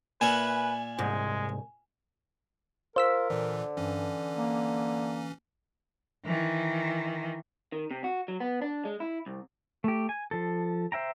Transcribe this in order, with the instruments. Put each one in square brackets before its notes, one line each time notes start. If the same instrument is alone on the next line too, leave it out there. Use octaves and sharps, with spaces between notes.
[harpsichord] A#2 E5 F#5 [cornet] B4 [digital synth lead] G#5
[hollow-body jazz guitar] C2 G#2 [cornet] G#3
[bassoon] F4 [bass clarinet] A#4 [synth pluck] C5 E6 B6
[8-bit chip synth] A#2 E3 [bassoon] D3
[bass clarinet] G2 [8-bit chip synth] E3 C#4
[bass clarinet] A#3
[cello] D#3 E3
[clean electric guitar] D#3
C3
F#4
F#3
B3
D4
G#3
E4
C2
[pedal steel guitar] A3 G4
G#5
F3 A4
C5 E5 G5 A#5